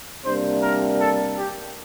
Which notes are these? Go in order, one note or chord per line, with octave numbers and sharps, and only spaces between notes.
C3 G3 A#3 D4 C5
A#4
A4
G4